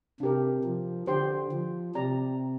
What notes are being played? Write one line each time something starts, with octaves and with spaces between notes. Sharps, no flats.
C3 D4 G4 A#4
F3
D3 G4 C5 G5 C6
F3
C3 G4 D5 A#5